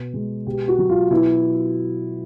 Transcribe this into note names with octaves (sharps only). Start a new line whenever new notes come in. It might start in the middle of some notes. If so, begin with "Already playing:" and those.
Already playing: B2
G#3
B2 G4
F#4
F#3
F4
B2 E4